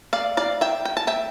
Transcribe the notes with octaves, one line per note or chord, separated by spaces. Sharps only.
D5 F5
D5 F5
E5 G5
G5
A5
E5 G5